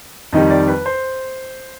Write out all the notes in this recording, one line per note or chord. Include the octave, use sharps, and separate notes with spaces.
F2 D#3 G3 D#5
D5
B4
C5